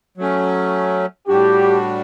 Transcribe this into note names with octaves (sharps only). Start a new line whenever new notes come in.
F#3 A3 C#4
A2 G3 D4 F#4 G4